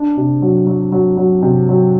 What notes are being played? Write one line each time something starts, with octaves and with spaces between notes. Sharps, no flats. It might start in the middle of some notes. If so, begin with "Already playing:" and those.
Already playing: D4
C3
F#3
F#3
F#3
F#3
C3
F#3